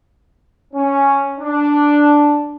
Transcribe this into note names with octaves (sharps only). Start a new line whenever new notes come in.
C#4
D4